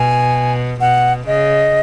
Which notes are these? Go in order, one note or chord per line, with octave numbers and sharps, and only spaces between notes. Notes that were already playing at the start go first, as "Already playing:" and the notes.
Already playing: B2 G#5
B2 F#5
C#3 D#5